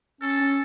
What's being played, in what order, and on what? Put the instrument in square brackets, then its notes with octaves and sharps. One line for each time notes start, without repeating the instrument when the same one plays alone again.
[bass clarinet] C#4 [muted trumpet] A4
[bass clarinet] C#4